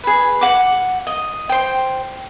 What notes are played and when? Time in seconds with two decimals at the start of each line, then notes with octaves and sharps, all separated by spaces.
0.03 G#4 B4
0.41 F#5 D6
1.07 D#5
1.49 C5 G5